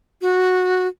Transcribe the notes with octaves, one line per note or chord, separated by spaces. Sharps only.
F#4